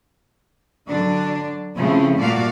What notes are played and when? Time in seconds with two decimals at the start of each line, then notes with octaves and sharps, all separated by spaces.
0.88 D3 F#3 D4 D5
1.76 C#3 F3 A3 C4 E4
2.18 A#2 G3 A3 F#4 D5 F5